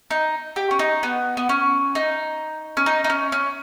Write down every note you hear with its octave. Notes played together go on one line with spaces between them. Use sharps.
D#4
G4
C#4
D#4
B3
B3
C#4
D#4
C#4
D#4
D#4
C#4
C#4